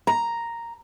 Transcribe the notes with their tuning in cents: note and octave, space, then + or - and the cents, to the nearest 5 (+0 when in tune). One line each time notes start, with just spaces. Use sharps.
A#5 +0